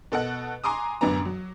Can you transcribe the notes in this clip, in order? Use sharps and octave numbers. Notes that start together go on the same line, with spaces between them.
B2 A4 D#5 F#5 F#6
G#5 A#5 C6 D6 D#6
A1 F#2 D3 B3 A#5
F#3